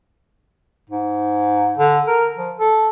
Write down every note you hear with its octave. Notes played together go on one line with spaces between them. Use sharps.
G#2
D3
A#4
F3
A4